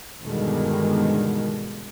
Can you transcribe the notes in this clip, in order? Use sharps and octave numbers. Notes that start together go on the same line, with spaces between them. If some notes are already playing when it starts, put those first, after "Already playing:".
E2 G2 B2 D3 D#3 G#3